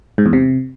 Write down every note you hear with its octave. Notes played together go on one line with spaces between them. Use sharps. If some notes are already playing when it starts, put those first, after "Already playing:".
G#2
E2
C3